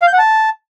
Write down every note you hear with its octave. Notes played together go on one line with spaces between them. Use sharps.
F5
G6
F#5
A5